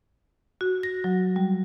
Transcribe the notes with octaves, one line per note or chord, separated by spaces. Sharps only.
F#4
A#6
F#3
G3